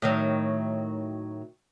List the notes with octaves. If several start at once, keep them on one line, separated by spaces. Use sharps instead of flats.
A2 D#3 F#3